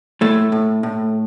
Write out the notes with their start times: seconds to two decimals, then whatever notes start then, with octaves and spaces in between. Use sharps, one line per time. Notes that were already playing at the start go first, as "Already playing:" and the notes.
0.21 A2 A3
0.52 A2
0.83 A2